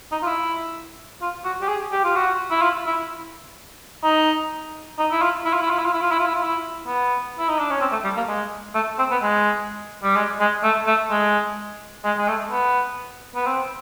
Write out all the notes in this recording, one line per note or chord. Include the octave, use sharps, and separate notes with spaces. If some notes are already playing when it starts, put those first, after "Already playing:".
D#4
F4
E4
F4
F#4
G4
G#4
G4
F4
F#4
E4
F4
E4
D#4
D#4
E4
F4
E4
F4
E4
F4
E4
F4
E4
F4
E4
F4
E4
F4
E4
B3
E4
D#4
D4
C#4
C4
A3
G3
A#3
G#3
A3
C4
B3
G#3
G3
G#3
G#3
A3
A3
G#3
G#3
G#3
A3
B3
B3
C4